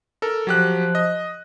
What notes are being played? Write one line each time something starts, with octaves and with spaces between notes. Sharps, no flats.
A4 A#4
F3 F#3 G4 F#6
D#5